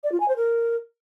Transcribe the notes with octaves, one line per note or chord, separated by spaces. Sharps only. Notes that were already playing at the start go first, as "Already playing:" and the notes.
D5
F4
G#5
C5
A#4